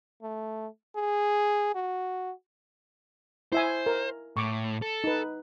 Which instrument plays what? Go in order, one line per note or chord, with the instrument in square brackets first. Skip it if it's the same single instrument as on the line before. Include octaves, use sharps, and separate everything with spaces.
[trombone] A3
G#4
F#4
[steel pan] E4 E5 G#5 [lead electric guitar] C5
[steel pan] A#4
[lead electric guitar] A2 [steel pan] C#6 D6
[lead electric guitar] A4
[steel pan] D#4 B4